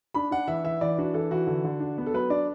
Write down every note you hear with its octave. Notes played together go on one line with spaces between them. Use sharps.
D4 B5
D4 F#5
E3 E5
E3 E5
E3 D5
D4 F#4
E3 A4
E3 F#4
D3
D3
D4
B3
A4
F#3 B4
D4 D5